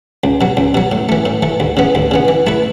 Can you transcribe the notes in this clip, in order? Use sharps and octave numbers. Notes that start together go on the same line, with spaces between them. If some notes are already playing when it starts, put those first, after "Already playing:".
C#2
B2 F#3
C#2
B2 F#3
A2
E3 A3
A2
E3 A3
D2
C#3 E3 B3
D2
C#3 E3 B3
E3
A3 E4 B4